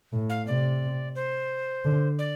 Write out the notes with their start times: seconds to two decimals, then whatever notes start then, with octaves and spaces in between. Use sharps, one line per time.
0.13 A2
0.29 F5
0.46 C3 D5
1.15 C5
1.85 D3
2.19 D5